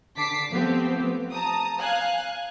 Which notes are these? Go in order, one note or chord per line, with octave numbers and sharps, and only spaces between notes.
D3 A5 D6 B6 C7
F3 A3 B3 C4 G4
A5 A#5 D#6
F5 G#5 F#6